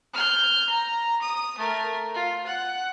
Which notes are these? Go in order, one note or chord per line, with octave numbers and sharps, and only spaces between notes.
F6 G6
A#5
D#6
A3 A#4
F4
F#5